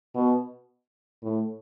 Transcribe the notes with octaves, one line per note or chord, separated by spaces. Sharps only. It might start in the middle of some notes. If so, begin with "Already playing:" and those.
B2
A2